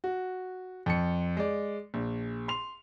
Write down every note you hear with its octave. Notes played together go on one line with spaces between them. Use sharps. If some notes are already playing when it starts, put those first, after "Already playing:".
F#4
F2 C#7
G#3 D5
A#1
C6 F7